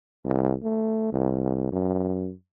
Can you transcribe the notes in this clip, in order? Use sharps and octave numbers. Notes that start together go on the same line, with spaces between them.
C2
A3
C2
F#2